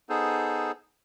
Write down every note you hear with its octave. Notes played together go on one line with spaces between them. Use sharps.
B3 D#4 G#4 A4 C5